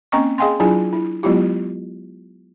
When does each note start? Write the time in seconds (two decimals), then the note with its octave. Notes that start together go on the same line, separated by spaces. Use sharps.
0.12 A#3 C4 C#4 D#5 A#5 C#6
0.38 G#4 D#5 F5 G5 G#5 C6
0.60 F#3 D4 E4 F4 G#4 G#5
0.93 E4
1.23 F#3 G#3 B3 E4 F4 G4